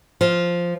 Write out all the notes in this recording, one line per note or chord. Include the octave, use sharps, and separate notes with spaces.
F3